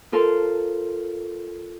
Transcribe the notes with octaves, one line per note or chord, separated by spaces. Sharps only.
F4 A4 A#4 C5 F5 C6